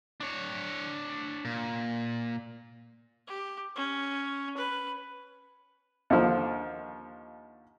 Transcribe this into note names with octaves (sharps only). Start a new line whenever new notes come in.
D4 C#5
A#2
G4
C#4
B4
D#2 D3 F3